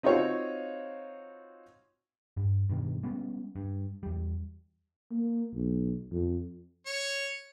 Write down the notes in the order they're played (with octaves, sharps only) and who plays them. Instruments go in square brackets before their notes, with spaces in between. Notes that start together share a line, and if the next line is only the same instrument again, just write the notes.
[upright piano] C4 D#4 F4 F#4 C#5
[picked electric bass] G2
G2 B2 D#3
G3 G#3 B3 C#4
G2
E2 G3
[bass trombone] A#3
B1
F2
[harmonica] C#5